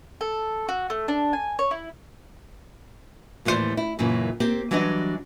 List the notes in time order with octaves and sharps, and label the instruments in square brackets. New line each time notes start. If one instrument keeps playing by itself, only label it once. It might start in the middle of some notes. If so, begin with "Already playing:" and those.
[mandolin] A4
F#4
A3
D4
G#5
C#5
E4
[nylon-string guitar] D#2 A2 E3 F4 C5 D5
E4
F#2 A#2 C#3 E3
A#3 C4 G4
E3 F#3 G3 D4 D5 D#5